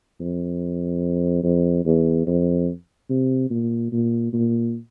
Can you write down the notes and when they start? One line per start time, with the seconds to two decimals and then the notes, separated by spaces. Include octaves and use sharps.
0.21 F2
1.43 F2
1.85 E2
2.27 F2
3.10 C3
3.50 A#2
3.92 A#2
4.33 A#2